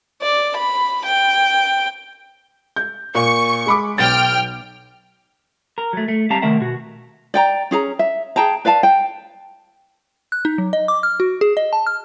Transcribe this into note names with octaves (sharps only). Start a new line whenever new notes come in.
D5
B5
G5
G6
A#2 C#6
G#3 B5 D6
B1 G5 F6 A6
A#4
F#3 A3
A3
G3 C4 F5 A5 A#5
C2 D#3 A3 A#4 E5 F#5
B2 F#4
D5 G5 A#5
C#4 G#4 A#5
E5
G#4 G5 A5 A#5
B4 D5 F5 A5
G5
F#6
D#4
F#3
D#5
D6
F6
F#4
G#4
D#5
A5
F6